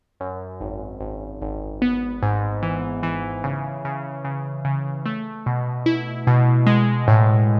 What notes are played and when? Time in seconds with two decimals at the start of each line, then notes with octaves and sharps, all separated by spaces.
0.20 F#2
0.61 G#1
1.01 G#1
1.42 G#1
1.82 B3
2.23 G#2
2.63 E3
3.03 E3
3.44 C#3
3.85 C#3
4.25 C#3
4.65 C#3
5.06 A3
5.46 B2
5.86 E4
6.27 B2
6.67 G#3
7.08 A2